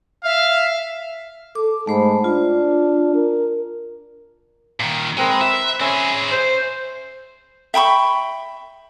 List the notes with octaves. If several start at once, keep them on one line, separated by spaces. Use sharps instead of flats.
E5 F5
A4 D6
G#2 A3 C5 B5
D4 F4
A#4
A#2 D#3
G#3 C4 A#4 B4
B4 E5 C6 D6
C4 C#4 G#4 E5 G#5
C5
E5 G5 B5 C#6